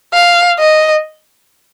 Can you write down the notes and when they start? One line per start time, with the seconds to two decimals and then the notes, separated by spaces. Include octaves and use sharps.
0.14 F5
0.59 D#5